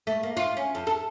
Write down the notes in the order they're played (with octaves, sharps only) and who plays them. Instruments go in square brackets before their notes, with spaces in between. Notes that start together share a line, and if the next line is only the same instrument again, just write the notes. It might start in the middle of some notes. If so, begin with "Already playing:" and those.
[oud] A3
A#3
F4
C#4
F2
A4